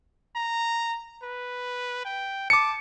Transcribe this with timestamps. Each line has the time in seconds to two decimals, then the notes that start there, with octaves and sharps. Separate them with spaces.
0.36 A#5
1.23 B4
2.05 G5
2.50 A5 D6 C#7